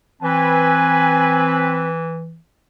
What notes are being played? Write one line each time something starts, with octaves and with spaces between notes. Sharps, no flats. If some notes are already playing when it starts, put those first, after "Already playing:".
E3 C4 B4 G#5